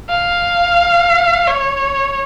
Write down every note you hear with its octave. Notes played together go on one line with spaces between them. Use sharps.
F5
C#5